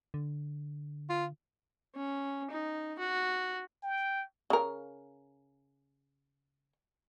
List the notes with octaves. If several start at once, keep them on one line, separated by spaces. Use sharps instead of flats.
D3
F4
C#4
D#4
F#4
G5
C#3 A#4